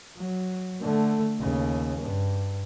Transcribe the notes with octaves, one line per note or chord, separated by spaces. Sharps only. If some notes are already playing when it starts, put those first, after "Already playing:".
F#3
D3 A3
D#2 C#3
G2